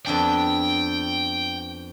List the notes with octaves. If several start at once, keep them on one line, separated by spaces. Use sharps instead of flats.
F2 B3 D4 G5